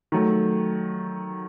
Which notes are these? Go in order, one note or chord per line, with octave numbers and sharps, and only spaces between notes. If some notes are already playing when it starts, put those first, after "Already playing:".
D#3 F#3 A3